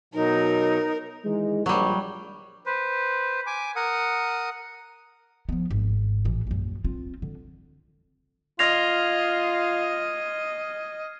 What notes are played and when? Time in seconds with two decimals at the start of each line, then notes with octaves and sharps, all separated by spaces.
0.14 B2 F#3 D#4 A#4
1.24 D#3 E3 G#3
1.66 A#1 F#3 G3
2.66 B4 C5
3.47 G#5 D6
3.76 A#4 F#5 D#6
5.49 F3 B3
5.71 G#1
6.25 A1 E3
6.47 A#1 F#2
6.84 C4 F4
7.22 D3
8.59 F4 D#5 C6 F6 G#6 A#6 C7 F7